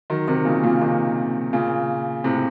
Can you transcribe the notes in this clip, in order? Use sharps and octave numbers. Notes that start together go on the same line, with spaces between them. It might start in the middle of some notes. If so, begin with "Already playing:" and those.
D#3 F#3
C3 D#3
A#2 C#3
A#2
C3 D#3
A#2 C#3
A2 C3